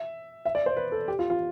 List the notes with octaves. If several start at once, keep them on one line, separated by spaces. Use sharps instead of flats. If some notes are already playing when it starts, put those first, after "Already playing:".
Already playing: E5
E5
D5
C5
B4
A4
G4
F4
F4